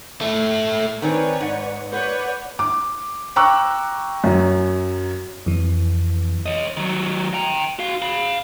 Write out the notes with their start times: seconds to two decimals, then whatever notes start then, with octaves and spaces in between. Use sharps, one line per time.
0.21 A3 E4
1.02 D#3 C4 B4 C#5 D5 G#5
1.40 G#2 F#5
1.93 B4 C#5 D5 F#5 G6
2.59 D6
3.36 G5 A#5 C#6 D6 E6 F#6
4.24 F#2 F#3
5.46 F2 E3
6.46 C#5 D#5
6.77 D#3 F#3
7.34 G5 A#5
7.79 F#4 F5
8.02 F5 B5